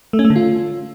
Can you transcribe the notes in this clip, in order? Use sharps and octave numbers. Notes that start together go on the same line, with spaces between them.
A3
C#4
A3
D3
F4